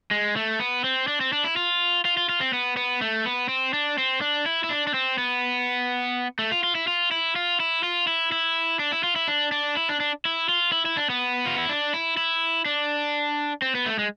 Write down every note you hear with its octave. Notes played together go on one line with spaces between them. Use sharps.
G#3
A3
B3
C4
D4
C4
D4
E4
F4
F4
F4
F4
C4
B3
B3
A3
B3
C4
D4
C4
D4
E4
E4
D4
D4
C4
B3
A3
F4
F4
E4
F4
E4
F4
E4
F4
E4
E4
D4
E4
F4
E4
D4
D4
E4
D4
D4
E4
F4
E4
E4
D4
B3
F4
E4
D4
E4
E4
D4
C4
B3
A3
G#3